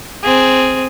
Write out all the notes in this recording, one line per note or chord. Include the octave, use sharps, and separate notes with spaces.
C4 G#4